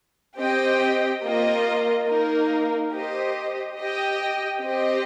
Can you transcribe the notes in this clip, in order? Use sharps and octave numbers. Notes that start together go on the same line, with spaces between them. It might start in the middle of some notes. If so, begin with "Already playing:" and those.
C4 G4 D#5 G5
A#3 F4 A#4 D#5
A#3 D#4 A#4
G4 C5 D#5
G4 D#5 G5
C4 G4 D#5 G5